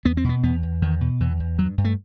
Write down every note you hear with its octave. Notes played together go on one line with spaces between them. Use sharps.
E2 B3
C4
B2 B3
E2 B3
E2
E2 D#3
B2
E2 E3
E2
G2 F#3
G2
A3